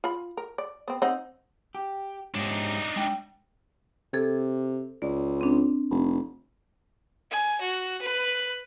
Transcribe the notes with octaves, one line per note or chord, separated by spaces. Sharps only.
F4 B5
A#4
D5
B3 C4
C4 D#4 F#5
G4
G#2 D4 D#4 G4 C#5
G#3 G5
C3 A4 G#6
C#2 D5
C4 D4
F1
G#5
F#4
B4